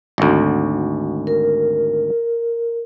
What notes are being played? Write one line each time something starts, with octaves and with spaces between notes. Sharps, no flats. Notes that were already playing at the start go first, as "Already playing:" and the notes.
G#1 D2
A#4